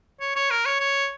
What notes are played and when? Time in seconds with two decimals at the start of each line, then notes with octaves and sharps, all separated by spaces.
0.21 C#5
0.36 C#5
0.51 A#4
0.66 C#5
0.80 C#5